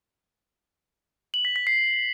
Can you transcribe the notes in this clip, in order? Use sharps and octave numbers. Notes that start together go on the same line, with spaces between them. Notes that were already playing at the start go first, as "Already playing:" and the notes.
F#7
B6
B6
C7